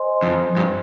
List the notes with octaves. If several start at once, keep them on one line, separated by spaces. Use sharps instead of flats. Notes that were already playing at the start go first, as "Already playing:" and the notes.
Already playing: C5 D#5 G#5 C6
F2
G2